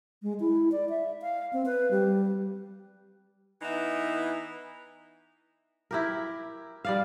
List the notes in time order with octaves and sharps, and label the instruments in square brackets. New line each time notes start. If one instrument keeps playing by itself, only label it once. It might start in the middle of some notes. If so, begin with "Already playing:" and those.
[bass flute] G#3
E4
D5
E5
F5
C4
B4
G3
[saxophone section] E3 B3 D#4 E4
[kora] E4 G4 A#4
G3 D5 F5